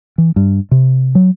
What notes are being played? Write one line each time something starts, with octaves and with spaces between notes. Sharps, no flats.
E3
G2
C3
F#3